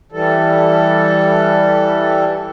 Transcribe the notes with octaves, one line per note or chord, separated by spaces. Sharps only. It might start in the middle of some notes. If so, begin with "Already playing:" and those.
E3 G3 A4